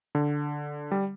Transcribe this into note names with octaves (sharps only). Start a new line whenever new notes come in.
D3
G3